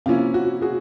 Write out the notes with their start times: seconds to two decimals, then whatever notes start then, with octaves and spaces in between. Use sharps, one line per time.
0.06 C3 F3 A#3 C#4 E4 F4
0.34 F#4
0.61 F#4 G#4